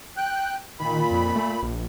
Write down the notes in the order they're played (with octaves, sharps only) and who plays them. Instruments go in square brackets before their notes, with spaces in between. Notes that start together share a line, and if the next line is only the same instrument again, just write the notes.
[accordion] G5 F#6
[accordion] A#2 B5 [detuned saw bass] D#3
[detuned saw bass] F2
A3
A#1